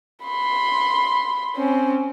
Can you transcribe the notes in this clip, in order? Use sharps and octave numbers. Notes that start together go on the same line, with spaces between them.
B5 C6
C4 C#4